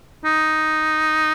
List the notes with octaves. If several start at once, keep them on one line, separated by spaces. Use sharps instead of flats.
D#4